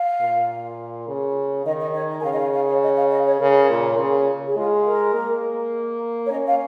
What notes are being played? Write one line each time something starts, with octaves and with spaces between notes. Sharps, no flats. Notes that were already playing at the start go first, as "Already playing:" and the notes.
Already playing: F5
A#2
C#3
D#3 D#5
D#5
C#5
D#5
G#5
C#3 F5
D#5
F5
F5
C#5
D#5
F5
D#5
C#5
C#3 A#4
A#2
C#3
G#4
G#3 F4
A#4
A#3
C#5
C#4 D#5
F5